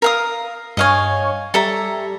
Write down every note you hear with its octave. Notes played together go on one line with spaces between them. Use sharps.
A#4 F5 D#6
G2 C#5 D#5 F5 G#5
G3 A4 E5 A#5